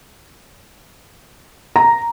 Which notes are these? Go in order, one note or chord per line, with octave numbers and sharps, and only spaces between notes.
A#5